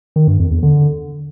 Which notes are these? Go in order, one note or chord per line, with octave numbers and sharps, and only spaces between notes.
D#3
G2
F2
E2
D3